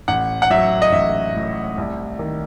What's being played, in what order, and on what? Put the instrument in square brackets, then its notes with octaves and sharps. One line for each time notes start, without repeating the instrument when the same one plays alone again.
[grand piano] A1 F#5
F#5
F#3 E5
D#5
A1 E5
A2
C2
D#3